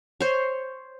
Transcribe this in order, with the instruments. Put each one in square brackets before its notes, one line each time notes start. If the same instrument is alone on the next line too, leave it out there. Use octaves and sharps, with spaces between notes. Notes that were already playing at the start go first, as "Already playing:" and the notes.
[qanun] C5 C#5